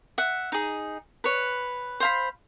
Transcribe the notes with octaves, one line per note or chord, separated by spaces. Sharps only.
E5 F#5
D#4 G#4
B4 C#5
C5 F5 B5